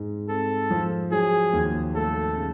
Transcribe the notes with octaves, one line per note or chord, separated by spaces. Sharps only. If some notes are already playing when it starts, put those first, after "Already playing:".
Already playing: G#2 G#3
C4 A4
F3
F#3 G#4
D#2
A3 A4
C#3